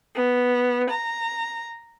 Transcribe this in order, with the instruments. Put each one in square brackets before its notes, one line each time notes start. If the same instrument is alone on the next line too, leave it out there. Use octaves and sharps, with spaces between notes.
[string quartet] B3
A#5